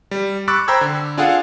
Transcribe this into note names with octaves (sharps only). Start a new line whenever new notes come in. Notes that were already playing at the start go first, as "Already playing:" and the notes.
G3
B5 C#6 D6 E6 F#6 A6
C5 G5 A#5 B5 E6 G#6
D3
D4 F4 G#4 A4 F5 F#5